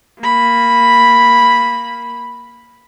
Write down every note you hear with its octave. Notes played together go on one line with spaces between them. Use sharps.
A#3 B5